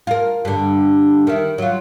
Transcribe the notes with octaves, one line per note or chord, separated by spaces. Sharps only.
F4 A#4
G2 D3
D#3 E4
F#3 F4